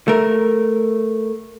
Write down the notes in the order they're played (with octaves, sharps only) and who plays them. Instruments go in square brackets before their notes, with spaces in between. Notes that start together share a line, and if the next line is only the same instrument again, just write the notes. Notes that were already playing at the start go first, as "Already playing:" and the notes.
[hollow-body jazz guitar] A3 A#4